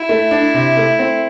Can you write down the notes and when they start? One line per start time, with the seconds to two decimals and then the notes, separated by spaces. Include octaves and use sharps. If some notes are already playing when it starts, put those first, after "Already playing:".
Already playing: E4
0.09 A3
0.31 D4
0.54 C3
0.77 A3
0.99 C4